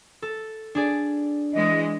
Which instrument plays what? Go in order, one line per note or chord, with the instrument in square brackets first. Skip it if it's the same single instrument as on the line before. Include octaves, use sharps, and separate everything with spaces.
[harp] A4
D4 G#4 D5
[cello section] E3 G#3 [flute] D#5